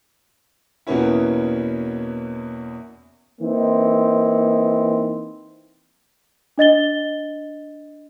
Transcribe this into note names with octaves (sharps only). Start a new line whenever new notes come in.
E2 B2 A#3 B3 C#4 E4
E3 A#3 C4 D#4
D4 D#5 A6 G7